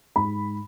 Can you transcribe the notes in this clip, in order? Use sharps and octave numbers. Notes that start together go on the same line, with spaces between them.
G#2 B5